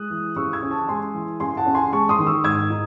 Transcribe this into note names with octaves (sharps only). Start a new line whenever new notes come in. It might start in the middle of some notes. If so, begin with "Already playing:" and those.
Already playing: G#3 D#6 F#6
E3
C#3 C#6 E6
E6 G#6
C#4
A5 C#6
G#3 G#5 C6
E3
C#3 G#5 C6
F#5 A5
C#4
G#5 C6
G#3 A5 C#6
C6 D#6
D#3
C#6 E6
G#2 E6 G#6
D#4